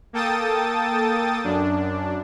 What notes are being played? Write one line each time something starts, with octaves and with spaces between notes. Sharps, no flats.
A#3 A4 G5 A5 D#6 A6
F#2 D4